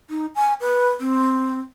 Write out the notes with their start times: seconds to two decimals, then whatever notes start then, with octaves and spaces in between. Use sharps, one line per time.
0.10 D#4
0.35 G#5
0.61 B4
1.00 C4